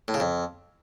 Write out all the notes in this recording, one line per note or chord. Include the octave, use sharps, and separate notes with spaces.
A2
C#3
F2